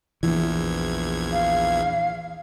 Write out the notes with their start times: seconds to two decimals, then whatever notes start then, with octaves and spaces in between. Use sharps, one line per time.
0.23 A#1 E2 E3 G#6
1.32 F5